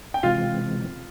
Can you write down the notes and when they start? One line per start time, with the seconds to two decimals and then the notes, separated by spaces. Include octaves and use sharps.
0.14 G5
0.23 C3 E3 G#3 C4 F4 F5